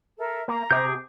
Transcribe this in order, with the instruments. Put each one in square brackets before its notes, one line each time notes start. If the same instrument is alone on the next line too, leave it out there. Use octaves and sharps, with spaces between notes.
[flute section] A4 A#4 E5
[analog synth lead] A#3 [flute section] A#5
[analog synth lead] C3 [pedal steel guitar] G#4 D6 G6